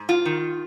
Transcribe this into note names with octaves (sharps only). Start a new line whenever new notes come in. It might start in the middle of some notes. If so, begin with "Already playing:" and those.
Already playing: G#2
F4
D#3